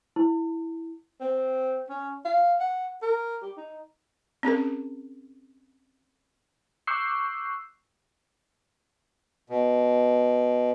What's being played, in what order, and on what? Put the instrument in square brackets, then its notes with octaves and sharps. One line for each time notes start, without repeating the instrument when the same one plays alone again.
[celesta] E4
[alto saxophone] C4
C#4
F5
F#5
A#4
G4
D#4
[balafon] C4 C#4 G#4 A#4
[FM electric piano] C#6 D6 E6 F#6 G6 C7
[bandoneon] B2